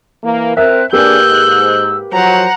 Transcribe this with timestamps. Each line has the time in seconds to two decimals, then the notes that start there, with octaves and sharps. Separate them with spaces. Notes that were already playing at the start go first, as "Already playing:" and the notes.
0.23 E3 A#3
0.57 C4 A#4 E5 F#6
0.92 A#3 D4 G4 G#4 B4 E6 F#6 G6
1.26 G#2
2.12 F3 F#3 C5 F#5 A#5